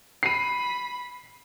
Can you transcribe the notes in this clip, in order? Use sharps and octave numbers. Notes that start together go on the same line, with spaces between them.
B5 C7 D#7